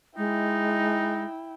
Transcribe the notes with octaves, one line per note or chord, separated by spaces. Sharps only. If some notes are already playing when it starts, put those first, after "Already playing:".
G#3 D#4 E4 G5